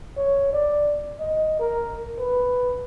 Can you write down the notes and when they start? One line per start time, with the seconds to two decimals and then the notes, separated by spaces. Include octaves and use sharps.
0.17 C#5
0.53 D5
1.20 D#5
1.60 A#4
2.19 B4